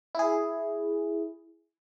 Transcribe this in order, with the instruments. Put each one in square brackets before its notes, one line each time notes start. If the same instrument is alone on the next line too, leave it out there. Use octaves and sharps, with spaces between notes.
[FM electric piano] E4 G#4